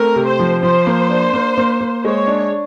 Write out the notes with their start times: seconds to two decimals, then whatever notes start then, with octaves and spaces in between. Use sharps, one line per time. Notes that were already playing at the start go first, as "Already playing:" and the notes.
Already playing: A3 C4 A#4
0.16 C3
0.28 C5
0.39 F3
0.63 F3 C5
0.87 A#3
1.09 D4
1.33 A#3
1.58 A#3
1.81 A#3
2.04 G#3 C#5
2.27 D4